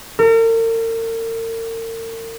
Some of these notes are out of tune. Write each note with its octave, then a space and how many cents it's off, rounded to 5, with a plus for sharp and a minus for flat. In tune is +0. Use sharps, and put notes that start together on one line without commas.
A#4 -40